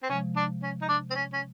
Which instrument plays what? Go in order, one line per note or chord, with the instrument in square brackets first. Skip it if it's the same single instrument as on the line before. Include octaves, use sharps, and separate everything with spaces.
[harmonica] C4
[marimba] C3 F3 G#3 [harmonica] C#4
[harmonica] D4
C#4
D#4
[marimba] C3 F3 G#3 [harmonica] D4
[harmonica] C4
C#4
C#4